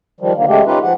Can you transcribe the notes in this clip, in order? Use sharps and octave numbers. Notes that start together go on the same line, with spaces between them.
D#3 F3 G3
D3 D#3 A#3
C#3 G#3 A3 G4
C#4 D#4 F4 G4 B4
F3 F#5